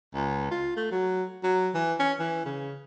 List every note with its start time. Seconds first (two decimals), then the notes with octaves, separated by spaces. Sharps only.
0.14 C#2
0.51 F4
0.76 A3
0.92 F#3
1.44 F#3
1.75 E3
1.99 C#4
2.20 E3
2.45 C#3